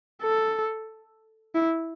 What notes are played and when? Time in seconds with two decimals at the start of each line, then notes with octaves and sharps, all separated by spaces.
0.22 A4
1.55 E4